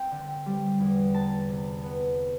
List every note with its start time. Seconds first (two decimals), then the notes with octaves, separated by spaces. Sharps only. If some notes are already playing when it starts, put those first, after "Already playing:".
Already playing: C4 G5
0.12 D3
0.46 G3
0.80 E2
1.14 B3 A5
1.49 C3
1.83 B3